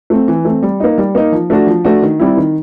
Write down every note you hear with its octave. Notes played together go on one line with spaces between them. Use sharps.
A3 C4
E3
A3 C4
G3
A#3 D#4
G3
A#3 D#4
F3
A3 D4 F#4
F3
A3 D4 F#4
D#3
G3 C4 E4
D#3